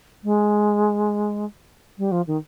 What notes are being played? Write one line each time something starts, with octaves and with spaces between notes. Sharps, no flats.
G#3
G3
F3
D#3